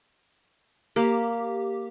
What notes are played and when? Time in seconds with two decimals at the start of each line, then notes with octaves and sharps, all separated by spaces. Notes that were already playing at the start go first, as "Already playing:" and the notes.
0.96 A#3 G4